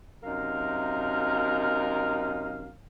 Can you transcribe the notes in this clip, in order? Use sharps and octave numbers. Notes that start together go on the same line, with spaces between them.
F#2 C3 D#4 A#4 F5